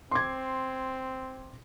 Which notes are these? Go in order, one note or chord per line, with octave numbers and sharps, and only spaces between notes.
C4 C6 D6 G#6